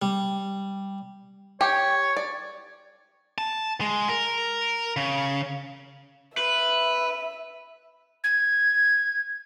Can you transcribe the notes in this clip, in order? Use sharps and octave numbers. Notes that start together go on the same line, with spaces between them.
G3
G4 C#5
D5
A5
G#3
A#4
C#3
B4 E5
G#6